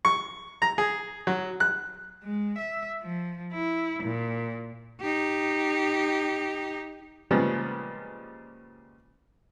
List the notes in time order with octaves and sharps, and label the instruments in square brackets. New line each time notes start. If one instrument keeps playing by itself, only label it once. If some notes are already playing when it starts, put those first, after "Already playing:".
[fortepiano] C#6
A#5
G#4
F#3
F#6
[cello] G#3
E5
F3
E4
A#2
D#4 G4
[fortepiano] A#2 C#3 F3 G3 G#3 B3